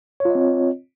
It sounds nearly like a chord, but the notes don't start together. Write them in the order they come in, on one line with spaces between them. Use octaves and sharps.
C#5 F4 D#5 C4